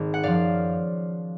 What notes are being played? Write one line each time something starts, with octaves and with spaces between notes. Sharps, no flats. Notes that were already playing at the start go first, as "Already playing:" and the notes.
Already playing: G#1
F#5
F#2 F3 D5 F5